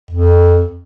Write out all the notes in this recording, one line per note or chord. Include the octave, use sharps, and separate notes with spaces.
F2